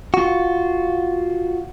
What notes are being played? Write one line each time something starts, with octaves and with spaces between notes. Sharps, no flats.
F4 F#4